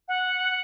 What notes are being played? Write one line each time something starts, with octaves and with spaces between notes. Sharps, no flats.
F#5